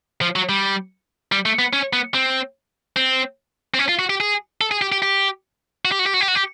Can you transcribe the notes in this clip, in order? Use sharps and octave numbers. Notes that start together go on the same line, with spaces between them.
F3
F#3
G3
G3
A3
B3
C#4
B3
C4
C4
C4
C#4
F4
F#4
G4
G#4
A4
G#4
G4
G4
G4
F#4
G4
F#4
G4
F#4
G4
F#4
G4